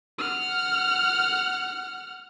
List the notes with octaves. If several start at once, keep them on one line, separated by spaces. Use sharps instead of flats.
F#5 F6